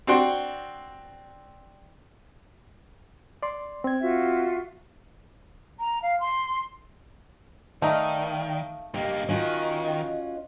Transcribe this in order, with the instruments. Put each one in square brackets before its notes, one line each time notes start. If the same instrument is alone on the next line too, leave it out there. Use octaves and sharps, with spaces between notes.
[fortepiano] C4 D4 F#4 G5 C6
[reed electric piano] D5 C6
C4 G#6
[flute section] F4 F#4 E5
[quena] A#5
F5
C6
[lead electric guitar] D#3 [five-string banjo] A3 D#4 [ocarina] D5 [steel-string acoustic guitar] F5
[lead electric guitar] G2 A#3 [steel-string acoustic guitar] G4 [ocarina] D#5
[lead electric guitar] D#3 [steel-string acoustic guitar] C#4 F4 F#4